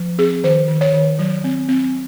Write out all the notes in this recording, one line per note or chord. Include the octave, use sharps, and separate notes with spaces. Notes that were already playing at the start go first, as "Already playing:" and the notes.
Already playing: F3
C4 G#4
D#3 C5
D#3
C#5
D#3
F#3
C4
C4